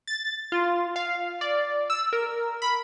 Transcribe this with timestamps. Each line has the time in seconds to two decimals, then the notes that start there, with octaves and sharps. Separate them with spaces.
0.07 A6
0.52 F4
0.96 F5
1.41 D5
1.90 E6
2.13 A#4
2.62 B5